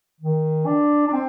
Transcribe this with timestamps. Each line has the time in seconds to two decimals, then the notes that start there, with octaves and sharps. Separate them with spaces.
0.20 D#3
0.66 D4
1.07 D4
1.13 C4